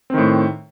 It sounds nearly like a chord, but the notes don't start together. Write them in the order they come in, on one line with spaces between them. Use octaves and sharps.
C4 D#3 A2